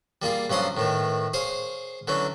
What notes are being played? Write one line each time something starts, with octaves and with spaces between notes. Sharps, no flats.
G3 A#3 F4 G#4
G2 F3 F#3 C#4 C6 D#6
A2 D#3 E3
G#4 C5 C#5 F5 G#5
D3 E3 F#3 C#4